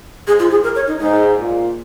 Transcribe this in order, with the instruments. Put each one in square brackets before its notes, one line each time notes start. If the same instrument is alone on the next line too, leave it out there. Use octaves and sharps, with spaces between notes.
[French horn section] G#2 [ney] G#4
[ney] F4
G#4
A#4
C#5
D#4
[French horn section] G#2 [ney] D#4
[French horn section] A#2